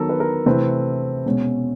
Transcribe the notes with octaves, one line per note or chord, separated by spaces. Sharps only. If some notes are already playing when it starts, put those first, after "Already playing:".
Already playing: D#3 F#3 B3 A4 A#4
B4
A#4
C3 E3 A3 C4 B4
B2 G#3 C#4